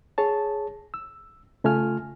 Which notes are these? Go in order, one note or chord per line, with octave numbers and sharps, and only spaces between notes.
G#4 C#5 A5
E6
C#3 A3 F4 G#5 F6